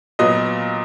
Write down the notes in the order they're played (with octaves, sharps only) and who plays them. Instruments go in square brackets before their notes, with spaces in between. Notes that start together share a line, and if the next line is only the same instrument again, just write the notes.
[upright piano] A#2 F#3 B3 D#5